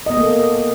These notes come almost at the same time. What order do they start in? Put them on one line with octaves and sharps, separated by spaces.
D#5 B3 G#4 A#3 A4